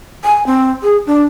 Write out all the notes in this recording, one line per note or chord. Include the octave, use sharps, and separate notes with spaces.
G#5
C4
G#4
D4